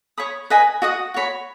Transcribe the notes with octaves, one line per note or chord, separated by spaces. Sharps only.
C#5 B5 D#6
B4 D#5 G#5
F#4 D#5 F#5 D#6
F#4 C#5 B5